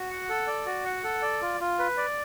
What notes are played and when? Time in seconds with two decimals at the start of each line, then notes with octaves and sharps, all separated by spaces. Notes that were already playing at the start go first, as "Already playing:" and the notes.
Already playing: F#4
0.10 F#5
0.29 A4
0.47 D5
0.66 F#4
0.85 F#5
1.04 A4
1.22 D5
1.42 F4
1.61 F4
1.79 B4
1.97 D5